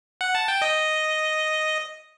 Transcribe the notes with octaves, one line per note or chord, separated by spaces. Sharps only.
F#5
A5
G5
D#5